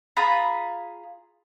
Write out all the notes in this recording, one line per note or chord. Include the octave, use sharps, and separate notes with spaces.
F4 G#4 A#5 B5